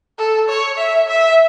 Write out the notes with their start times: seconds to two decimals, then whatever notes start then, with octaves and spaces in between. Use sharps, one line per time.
0.18 A4
0.49 C#5
0.77 E5
1.08 E5